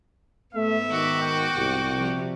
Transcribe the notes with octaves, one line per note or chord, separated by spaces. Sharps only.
G#2 A3 B3 E5
D#3 F#4 D6
G5
C2 G#2
C3 F3 G3